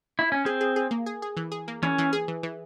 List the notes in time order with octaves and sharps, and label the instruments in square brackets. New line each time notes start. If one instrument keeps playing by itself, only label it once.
[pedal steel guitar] E4
C#4
[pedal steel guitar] C4 [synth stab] G#4
[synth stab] G#4
G#4
A#3
G#4
G#4
E3
G#4
A#3
[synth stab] E3 [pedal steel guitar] C#4
[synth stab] E3
G#4
E3
E3